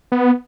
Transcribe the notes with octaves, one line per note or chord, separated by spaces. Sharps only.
B3